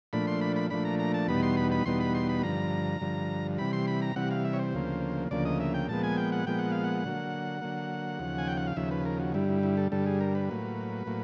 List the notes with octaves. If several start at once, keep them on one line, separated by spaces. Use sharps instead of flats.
A#2 F3 A3 D4 B5
C6
B5
B5
A#2 F3 A3 D4 B5
A#5
A#5
A5
E2 B2 G3 B3 D#4 B5
C6
B5
B5
E2 B2 G3 B3 D#4 C6
B5
C6
B5
G2 D3 F3 A#5
G2 D3 F3
C3 E3 G3 B5
C6
B5
A#5
C3 E3 G3 F#5
F5
E5
C#5
C5
D2 C#3 F3 A#3
D2 C#3 F3 A#3 D5
D#5
E5
G5
A#2 F3 G#3 B3 A5
G#5
G5
F#5
A#2 F3 G#3 B3 G5
F#5
F5
F#5
D3 F#3 A#3
D3 F#3 A#3
D#2 C#3 F3
G#5
G5
F#5
F5
D#2 C#3 F3 E5
B4
A#4
F#4
G2 D3 G3 E4
E4
E4
A4
G2 D3 G3 A4
G#4
A#4
B4
A2 F#3 A#3
A2 F#3 A#3